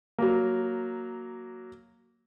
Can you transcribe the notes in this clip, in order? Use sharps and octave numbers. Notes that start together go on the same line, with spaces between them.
F#3 A#3